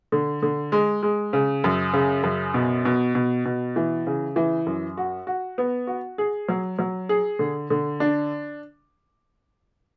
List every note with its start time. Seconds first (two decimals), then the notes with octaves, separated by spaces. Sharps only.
0.12 D3
0.42 D3
0.72 G#3
1.03 G#3
1.33 C#3
1.64 F#2
1.93 C#3
2.23 F#2
2.54 B2
2.85 B2
3.15 B2
3.45 B2
3.76 E3
4.07 C#3
4.36 E3
4.66 F#2
4.97 F#4
5.27 F#4
5.58 B3
5.87 F#4
6.18 G#4
6.49 F#3
6.79 F#3
7.09 G#4
7.39 D3
7.70 D3
8.00 D4